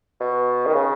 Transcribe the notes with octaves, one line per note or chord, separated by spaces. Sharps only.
B2
D#3
C#3